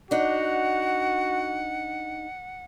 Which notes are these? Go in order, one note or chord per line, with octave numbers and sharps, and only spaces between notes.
D4 D#4 F#4 F#5